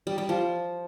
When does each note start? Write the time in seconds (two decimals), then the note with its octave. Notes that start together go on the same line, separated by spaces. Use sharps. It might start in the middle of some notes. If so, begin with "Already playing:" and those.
0.07 G3
0.18 G3
0.29 F3